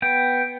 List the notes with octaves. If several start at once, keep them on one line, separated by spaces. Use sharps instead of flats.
B3 G5